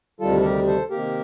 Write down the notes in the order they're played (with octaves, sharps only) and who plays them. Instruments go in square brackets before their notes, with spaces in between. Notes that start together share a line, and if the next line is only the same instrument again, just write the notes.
[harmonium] D2 C3 D#3 G3 F4 A4
A4
G4 A#4
A4 C5
C3 D#3 A#3 G4 A#4